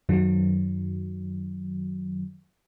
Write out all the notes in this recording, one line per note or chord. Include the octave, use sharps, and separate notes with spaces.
F#2 D#3 F#3